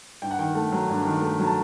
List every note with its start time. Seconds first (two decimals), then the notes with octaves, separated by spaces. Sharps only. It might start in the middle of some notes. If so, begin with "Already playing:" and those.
0.22 G2 G5
0.31 F#5
0.39 D#3 G5
0.55 A3
0.72 F#3
0.89 G2
1.05 D#3
1.22 A3
1.39 F#3
1.45 A5